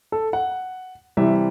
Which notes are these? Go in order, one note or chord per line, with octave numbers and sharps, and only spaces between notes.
A4
F#5
C3 E3 G3 E5